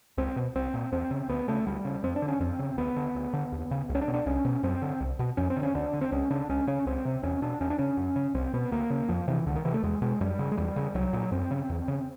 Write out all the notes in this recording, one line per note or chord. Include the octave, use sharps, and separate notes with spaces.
C#2 C4
B2
C2 C4
A#2
E2 C4
C#3
D2 B3
C#3 A3
D2 G3
C#3
F2 C4
D4
D3
C#4
F2 C4
C#3
D2 B3
D3
D2
D3
D#2
C#3
C#2
C#4
D4
B2
D4
C2 C#4
B2
F#2 C4
D3
C2
B2
F2 C#4
C4
D3
C#4
D2 D4
D3
C4
C#2 C#4
C#3 D4
C#2 C#4
C#3 C#4
C#2 C4
C3
E2 C#4
B2 D4
E2 C#4
D4
C#3 C#4
F#2
C#3
C2 C4
B2 B3
D2 A#3
C#3
F2 F3
C3 E3
C#2 D3
D#3
C3 E3
A3
E2 G#3
B2 G#3
F#2 G3
C#3
G#3
E2 G3
C#3
C2 F#3
A#2
F#2 C4
C#3
E2
C#3